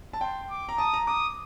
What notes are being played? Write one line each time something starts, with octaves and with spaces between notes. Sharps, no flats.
A5
G5 C6
D6
A#5
A5 D#6
A#5
D6 D#6